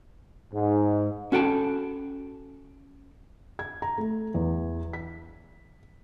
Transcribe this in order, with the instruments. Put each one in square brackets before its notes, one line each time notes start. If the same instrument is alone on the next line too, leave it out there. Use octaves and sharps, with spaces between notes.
[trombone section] G#2
[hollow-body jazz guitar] C#4 F#4 A4 G5 A5
[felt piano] G#6
A#5
A3
E2
B6